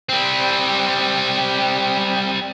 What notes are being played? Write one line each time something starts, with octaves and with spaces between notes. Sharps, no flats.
G3 C4